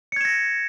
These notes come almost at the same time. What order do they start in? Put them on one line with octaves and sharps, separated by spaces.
C#7 G#6 E7 A#6